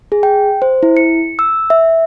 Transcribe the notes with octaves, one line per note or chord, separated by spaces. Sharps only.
G#4
G5
C5
E4
C#7
E6
E5